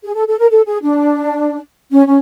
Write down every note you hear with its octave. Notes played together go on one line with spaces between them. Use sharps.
G#4
A4
A4
A#4
A4
G#4
D4
C#4
C#4